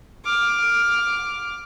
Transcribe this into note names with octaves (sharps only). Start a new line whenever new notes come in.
D6 F6